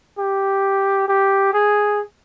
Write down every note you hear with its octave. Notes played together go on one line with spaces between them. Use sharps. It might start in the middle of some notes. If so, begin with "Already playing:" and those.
G4
G4
G#4